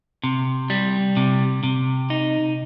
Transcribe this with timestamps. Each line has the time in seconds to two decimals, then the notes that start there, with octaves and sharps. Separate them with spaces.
0.23 C3
0.70 G3
1.17 C3
1.64 C3
2.10 D#4